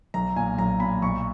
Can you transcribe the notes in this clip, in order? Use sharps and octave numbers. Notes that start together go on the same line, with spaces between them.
B1 A#5
A#2 G#5
B1 A#5
A#2 B5
B1 C#6